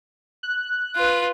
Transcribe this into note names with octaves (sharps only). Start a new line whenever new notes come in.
F#6
F4 B4